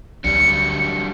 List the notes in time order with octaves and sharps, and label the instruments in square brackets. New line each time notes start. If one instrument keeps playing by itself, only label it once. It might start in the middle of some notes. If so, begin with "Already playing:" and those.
[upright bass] D2 [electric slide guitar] F#3 G3 D4 [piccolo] C#7